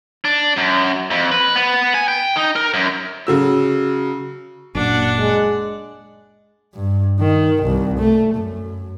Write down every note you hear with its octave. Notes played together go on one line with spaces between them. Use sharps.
D4
F#2
F2
B4
B3
G#5
G5
D#4
A#4
F#2
C#3 F#3 E6
F#1 A#2 D4 F#5
G#3
G2
D#3
C2
A3
F#2